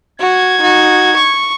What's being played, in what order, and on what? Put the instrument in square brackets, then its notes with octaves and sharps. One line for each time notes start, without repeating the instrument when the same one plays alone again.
[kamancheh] F#4 [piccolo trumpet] G#6
[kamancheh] D#4 F#4
C#6